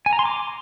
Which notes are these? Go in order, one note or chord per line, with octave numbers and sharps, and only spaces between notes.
G#5
A#5
C6
D6